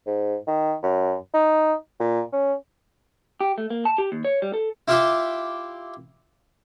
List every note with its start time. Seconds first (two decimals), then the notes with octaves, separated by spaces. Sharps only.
0.06 G#2
0.47 D#3
0.83 F#2
1.34 D#4
2.00 A#2
2.33 C#4
3.41 G4
3.58 A3
3.70 A#3
3.85 A5
3.98 G4
4.12 D#2
4.25 C#5
4.42 G3
4.54 A4
4.88 E4 F4 G4 E5 C6 D6